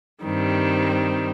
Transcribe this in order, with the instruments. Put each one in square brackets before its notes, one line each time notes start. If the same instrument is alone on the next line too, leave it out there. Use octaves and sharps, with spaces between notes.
[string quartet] G2 D#3 G3 C4